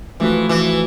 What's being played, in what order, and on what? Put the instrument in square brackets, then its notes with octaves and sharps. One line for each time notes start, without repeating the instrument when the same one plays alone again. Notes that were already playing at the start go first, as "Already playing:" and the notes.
[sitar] E3 [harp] F3 A3 D4 F#4 B4
[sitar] E3